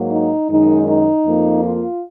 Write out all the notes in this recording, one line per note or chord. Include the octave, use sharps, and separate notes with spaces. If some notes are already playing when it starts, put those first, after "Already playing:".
Already playing: G#2 F#3 A#3
D#4
F#2 D#3 G#3 D#4
D#4
F2 F3 A#3
F4